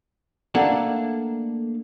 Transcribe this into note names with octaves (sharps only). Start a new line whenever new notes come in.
A3 A#3 D4 A4 F#5